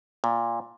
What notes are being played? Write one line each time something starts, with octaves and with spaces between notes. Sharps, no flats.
A#2